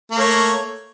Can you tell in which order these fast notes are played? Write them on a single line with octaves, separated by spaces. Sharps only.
A#3 A3 C#5